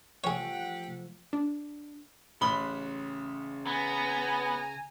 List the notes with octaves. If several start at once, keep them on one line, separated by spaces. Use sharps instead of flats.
F3 A3 G4 G#4 C#5 F#5 G5
D4
A1 C#3 B5 C6 F#6 G7
B3 G#5 A#5